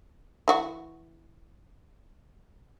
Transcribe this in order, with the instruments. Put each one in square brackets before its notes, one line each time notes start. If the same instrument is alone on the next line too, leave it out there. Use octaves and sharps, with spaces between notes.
[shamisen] E3 F#4 F#5